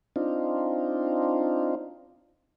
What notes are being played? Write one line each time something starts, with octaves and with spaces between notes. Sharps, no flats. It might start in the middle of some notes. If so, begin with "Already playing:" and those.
C4 D4 D#4 F4